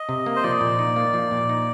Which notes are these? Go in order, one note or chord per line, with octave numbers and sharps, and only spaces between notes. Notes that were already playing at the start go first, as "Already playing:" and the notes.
Already playing: D#5
C3
A#3
C5
F3 D5
A#2
D#4
A#3
F3
A#2
D#4